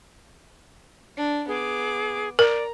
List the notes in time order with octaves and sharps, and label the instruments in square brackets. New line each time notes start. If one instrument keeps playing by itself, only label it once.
[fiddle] D4
[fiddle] B3 D6 [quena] G#4
[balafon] A#4 [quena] D5 [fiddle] A#5